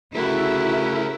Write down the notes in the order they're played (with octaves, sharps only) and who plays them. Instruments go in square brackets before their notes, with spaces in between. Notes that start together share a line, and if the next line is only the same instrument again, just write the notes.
[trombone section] C#3 A3 [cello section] E4 [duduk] F#4 [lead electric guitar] G4 A#4